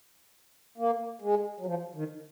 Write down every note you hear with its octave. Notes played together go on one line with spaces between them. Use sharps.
A#3
G#3
F#3
F3
D#3